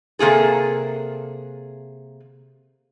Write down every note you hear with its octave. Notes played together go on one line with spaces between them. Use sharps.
C3 A#3 G#4 A4